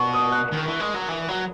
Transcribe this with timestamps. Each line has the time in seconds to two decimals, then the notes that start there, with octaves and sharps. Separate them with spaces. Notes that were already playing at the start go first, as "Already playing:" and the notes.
Already playing: B2 C#6
0.13 D#6
0.32 F#6
0.52 D#3
0.66 E3
0.80 G#3
0.95 F#3
1.09 E3
1.28 F#3